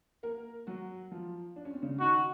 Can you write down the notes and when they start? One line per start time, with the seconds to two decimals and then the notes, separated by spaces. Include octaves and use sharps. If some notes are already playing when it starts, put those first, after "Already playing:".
0.23 A#3 A#4
0.67 F#3 F#4
1.12 F3 F4
1.56 D4
1.65 C#4
1.74 C4
1.82 C#3 C#4
2.00 D#3 D#4 F#4